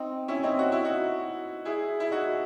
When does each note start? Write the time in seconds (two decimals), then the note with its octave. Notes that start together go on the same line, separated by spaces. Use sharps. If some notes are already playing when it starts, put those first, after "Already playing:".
Already playing: C4 D#4
0.28 C#4 E4
0.43 C4 D#4
0.59 F#4
0.72 E4
0.84 D#4 F#4
1.65 E4 G#4
2.00 E4
2.11 D#4 F#4